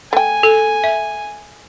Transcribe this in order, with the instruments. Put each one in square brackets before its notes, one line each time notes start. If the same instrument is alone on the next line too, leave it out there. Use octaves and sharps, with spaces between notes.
[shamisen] A3 G5 [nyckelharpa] G#5
[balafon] A4
E5